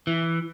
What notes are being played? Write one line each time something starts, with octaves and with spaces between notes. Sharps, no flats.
E3